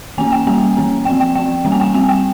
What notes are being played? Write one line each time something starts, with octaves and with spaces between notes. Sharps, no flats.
E3 A#3 C#4 G#5
G5
G3 A#3 C#4 G#5
E3 A#3 C#4
F3 C4 G5
G5
F3 C4 G5
E3 G3 A#3 C#4
G#5
G5
G3 C4 G#5
G5